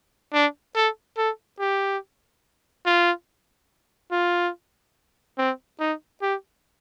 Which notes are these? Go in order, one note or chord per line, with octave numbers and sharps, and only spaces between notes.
D4
A4
A4
G4
F4
F4
C4
D#4
G4